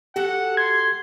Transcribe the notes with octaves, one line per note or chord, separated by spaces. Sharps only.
F#4 G4 A4 F#5
C6 G#6